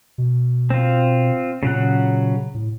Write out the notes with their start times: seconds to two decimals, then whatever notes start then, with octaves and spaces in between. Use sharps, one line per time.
0.18 B2
0.70 C4 F4
1.63 A#2 C#3 F#3 F#5
2.54 A2